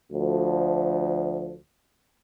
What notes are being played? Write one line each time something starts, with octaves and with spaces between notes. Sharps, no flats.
D2 F3